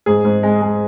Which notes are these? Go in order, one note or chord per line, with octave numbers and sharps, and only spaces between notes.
G#2 G#4
G#2
G#3
G#3